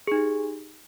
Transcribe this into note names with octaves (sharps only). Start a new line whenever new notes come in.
D#4 G4 G#4